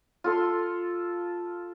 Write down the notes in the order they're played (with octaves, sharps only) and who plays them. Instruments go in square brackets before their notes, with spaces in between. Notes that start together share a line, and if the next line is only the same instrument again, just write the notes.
[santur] F4 A4 C6